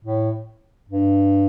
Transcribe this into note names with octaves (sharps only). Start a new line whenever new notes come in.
A2
G2